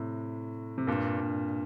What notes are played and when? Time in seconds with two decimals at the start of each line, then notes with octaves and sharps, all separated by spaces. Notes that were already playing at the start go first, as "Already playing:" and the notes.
Already playing: A2 C3
0.78 C3
0.87 G2 A#2
1.20 G2